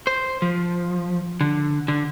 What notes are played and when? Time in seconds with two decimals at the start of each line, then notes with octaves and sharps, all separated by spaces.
0.07 C5
0.42 F3
1.41 D3
1.88 D3